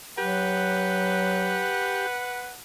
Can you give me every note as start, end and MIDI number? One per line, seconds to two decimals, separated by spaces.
0.18 1.68 54
0.18 2.07 67
0.18 2.53 71
0.18 2.59 78